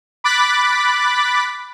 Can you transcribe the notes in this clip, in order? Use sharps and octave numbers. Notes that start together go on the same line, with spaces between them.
B5 D6 F#6 A6 B6